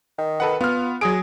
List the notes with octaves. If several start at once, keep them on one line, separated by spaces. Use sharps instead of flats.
D#3
A4 B4 F#5
B3 F4 F6
F#3 G#4 D#6 D7